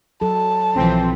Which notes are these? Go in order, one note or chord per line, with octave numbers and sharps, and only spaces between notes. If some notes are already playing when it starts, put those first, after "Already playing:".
F#3 A4 A5
B1 E3 F3 C4